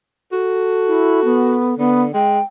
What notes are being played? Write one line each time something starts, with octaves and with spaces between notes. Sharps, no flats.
F#4 A4
E4
B3
D3 B3
G#3 G5